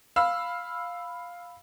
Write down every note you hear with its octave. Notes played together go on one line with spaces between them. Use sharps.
F5 B5 E6